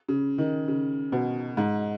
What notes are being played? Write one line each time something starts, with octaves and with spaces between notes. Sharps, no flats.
C#3
D#3
C#3
B2
G#2